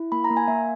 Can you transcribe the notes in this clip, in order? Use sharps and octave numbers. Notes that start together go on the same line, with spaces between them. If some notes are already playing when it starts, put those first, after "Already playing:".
Already playing: E4
A#3 B5
A#5
A#3
G#5
A#3 E5